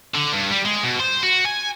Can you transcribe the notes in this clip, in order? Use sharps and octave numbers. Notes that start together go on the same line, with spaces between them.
D3
G2
G3
G#3
B2
C5
F#4
G#5